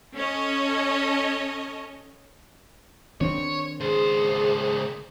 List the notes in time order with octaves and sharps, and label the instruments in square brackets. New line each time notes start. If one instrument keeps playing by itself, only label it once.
[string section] C#4 A4 C#5 D#5
[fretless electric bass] D#3 C4 D4 [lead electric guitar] C#5
[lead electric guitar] C#2 C5 [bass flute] G#4